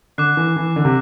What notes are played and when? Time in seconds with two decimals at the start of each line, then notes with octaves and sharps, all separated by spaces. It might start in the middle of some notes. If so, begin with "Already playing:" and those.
0.18 D3 D6 F#6 C7
0.37 E3
0.56 E3
0.76 D3
0.85 C3